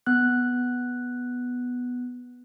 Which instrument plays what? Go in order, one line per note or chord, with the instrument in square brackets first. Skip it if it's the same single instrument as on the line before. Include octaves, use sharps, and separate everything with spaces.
[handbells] B3 F#6